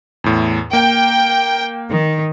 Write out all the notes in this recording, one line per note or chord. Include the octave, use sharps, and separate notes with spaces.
E2 A2
A#3 G5
D#3